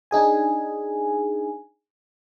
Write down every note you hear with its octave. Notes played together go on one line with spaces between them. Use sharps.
D4 D#4 G#4 G#5